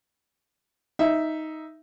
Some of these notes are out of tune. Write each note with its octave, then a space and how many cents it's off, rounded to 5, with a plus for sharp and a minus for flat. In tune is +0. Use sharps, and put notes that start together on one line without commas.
D#4 +10 E5 +0